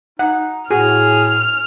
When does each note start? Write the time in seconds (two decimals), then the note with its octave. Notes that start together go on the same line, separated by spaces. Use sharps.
0.19 D#4 F#5
0.71 A2 F#4 G#4 F6